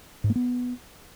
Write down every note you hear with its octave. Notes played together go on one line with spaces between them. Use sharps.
G#2
A#3
B3